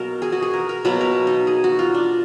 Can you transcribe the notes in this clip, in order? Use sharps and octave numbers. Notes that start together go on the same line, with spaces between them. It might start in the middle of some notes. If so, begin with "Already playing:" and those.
Already playing: B2 F#3 A#3 A#4
G#4
F#4
G#4
A#4
A#4
B2 F#3 A#3 B4
A#4
D#4
G#4
F#4
F4
D4